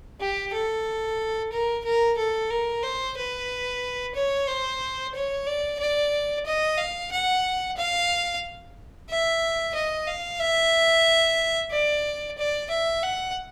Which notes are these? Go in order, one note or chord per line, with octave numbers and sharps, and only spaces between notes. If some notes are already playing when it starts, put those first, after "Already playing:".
G4
A4
A#4
A#4
A4
A#4
C5
B4
C#5
C5
C#5
D5
D5
D#5
F5
F#5
F5
E5
D#5
F5
E5
D5
D5
E5
F#5